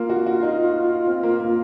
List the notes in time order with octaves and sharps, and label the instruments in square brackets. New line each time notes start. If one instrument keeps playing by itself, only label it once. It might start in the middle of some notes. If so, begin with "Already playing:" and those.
Already playing: [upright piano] A#3 [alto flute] F4
[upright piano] F#4
F#4
D#4
C4
A#3
A#3